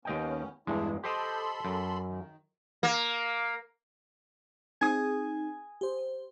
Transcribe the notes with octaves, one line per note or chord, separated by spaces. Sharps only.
D#2 B3 C#4 D#5 G5
E2 G2 G#3 D4 E4
G4 A4 C5 D#5 B5 C6
F#2
D#3
A#3
C4 D#4 G#4 G#5 D#6
G4 C5